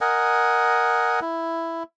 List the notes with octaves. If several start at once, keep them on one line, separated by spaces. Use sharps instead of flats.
A#4 D#5 F#5 G#5
E4